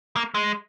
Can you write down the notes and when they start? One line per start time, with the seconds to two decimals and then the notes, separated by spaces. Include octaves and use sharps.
0.16 A#3
0.35 G#3